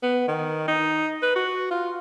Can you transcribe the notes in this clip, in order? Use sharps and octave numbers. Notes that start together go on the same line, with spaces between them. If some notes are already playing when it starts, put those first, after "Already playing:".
B3
D#3
D#4
B4
F#4
F4